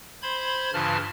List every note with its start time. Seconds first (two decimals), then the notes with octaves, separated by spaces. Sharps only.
0.23 C5 B5 C6 G#6
0.73 G2 C#3 E3 F4 A5 F6